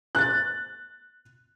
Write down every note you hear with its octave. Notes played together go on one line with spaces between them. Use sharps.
F#6 A6